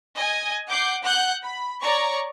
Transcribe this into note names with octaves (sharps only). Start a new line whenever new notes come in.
D#5 G#5
F#5 D6 G6 C7
F#5 F#6 G6
B5
C#5 D5 A#5 C#6